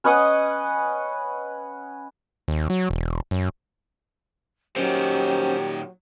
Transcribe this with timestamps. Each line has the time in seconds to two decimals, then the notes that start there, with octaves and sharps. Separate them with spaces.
0.04 C#4 B4 D#5 F#5
2.48 D#2
2.70 F#3
2.90 E1
3.31 F#2
4.76 A#2 D#3 F#3 C#4 G4 C5